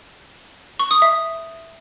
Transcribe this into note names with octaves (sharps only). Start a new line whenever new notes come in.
C#6
D#6
E5